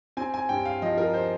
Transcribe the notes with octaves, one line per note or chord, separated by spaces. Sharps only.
C4 G#5
G#5
G2 G5
F5
F3 D#5
A#4
C5